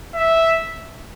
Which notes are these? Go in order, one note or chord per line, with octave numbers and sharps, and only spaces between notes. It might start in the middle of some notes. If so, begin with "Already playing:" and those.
E5